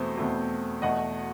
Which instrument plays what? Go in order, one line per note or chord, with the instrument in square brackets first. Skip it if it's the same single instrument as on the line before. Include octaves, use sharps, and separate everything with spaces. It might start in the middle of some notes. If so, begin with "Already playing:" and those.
Already playing: [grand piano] E2 B2 A3 C4 C5
E2 B2 A3 C4
E2 B2 A3 D#5 F#5